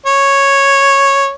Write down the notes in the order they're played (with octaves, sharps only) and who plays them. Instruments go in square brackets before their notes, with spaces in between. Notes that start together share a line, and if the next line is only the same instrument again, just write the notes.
[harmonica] C#5